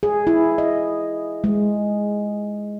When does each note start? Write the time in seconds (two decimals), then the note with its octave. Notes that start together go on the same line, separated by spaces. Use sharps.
0.03 G#4
0.27 E4
0.58 D#5
1.44 G#3